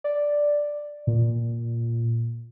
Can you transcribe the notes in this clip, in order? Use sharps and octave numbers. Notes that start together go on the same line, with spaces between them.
D5
A#2